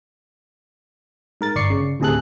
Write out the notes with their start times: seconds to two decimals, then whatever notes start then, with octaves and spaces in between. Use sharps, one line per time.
1.41 G#2 A#4 A6
1.56 G1 D5 C#6 C7 C#7
1.70 C#3
2.00 D2 A2 C3 G#4 A4 F#6